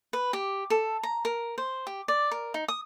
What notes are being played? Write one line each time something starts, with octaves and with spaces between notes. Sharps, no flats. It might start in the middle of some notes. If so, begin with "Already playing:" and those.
B4
G4
A4
A#5
A#4
C5
G4
D5
A#4
D#4
D#6